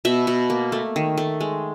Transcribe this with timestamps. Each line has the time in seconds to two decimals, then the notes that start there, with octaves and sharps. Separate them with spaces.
0.05 B2 E5
0.27 B2
0.50 A#3
0.72 A3
0.96 D#3
1.17 A3
1.41 G#3